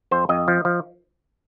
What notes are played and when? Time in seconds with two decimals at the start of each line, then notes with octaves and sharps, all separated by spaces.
0.11 F2 C5
0.29 F2 D#5
0.48 F3
0.65 F3